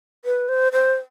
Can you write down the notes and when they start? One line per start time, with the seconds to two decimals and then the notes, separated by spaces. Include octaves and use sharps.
0.25 B4
0.49 C5
0.72 C5